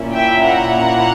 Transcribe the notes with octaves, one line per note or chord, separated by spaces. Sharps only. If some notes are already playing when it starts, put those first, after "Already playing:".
Already playing: A#2 A#3 C#4 E4
E5 G5
F#5 A#5